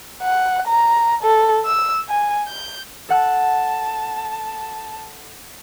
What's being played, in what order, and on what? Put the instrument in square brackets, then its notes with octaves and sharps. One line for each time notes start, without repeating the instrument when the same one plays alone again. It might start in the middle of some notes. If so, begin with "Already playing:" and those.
[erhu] F#5
A#5
A4
E6
G#5
G6
[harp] A4 F#5 F#6 [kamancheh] A5